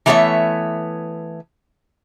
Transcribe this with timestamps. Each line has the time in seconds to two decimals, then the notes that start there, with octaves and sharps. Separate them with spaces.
0.06 E3 A3 B3 G#4 C#5 E5